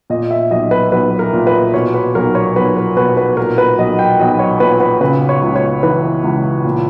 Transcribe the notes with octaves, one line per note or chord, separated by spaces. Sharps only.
A#2 D#5
E5
B1 D#5
B4
B1 B4
A#4
A#2
B4
B2 C#5
B4
B1 A#4
C#5
B1 B4
A#4
B2 B4
B4
A#2 A#4
B4
B1 D#5
G5
B1 D#5
C#5
A#2 B4
B4
C#3 B4
C#5
C#2
C#5
E3 B4
C#2
A#2